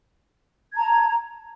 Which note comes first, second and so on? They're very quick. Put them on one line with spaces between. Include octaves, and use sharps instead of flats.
G#6 A5 A#5